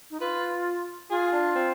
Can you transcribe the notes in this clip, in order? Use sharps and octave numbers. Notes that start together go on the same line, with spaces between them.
D#4
F4 B4
F4 G#4
D4
C4